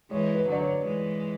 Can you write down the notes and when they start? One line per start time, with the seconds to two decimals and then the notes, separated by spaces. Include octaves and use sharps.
0.11 E3 G#3 C#5
0.35 B4
0.48 D3 F#3 D5
0.60 C#5
0.85 E3 G#3